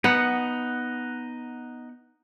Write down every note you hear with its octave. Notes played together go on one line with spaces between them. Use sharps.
B3 D#4 F#5